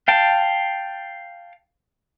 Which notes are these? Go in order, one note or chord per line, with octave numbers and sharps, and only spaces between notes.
F5 G5 A5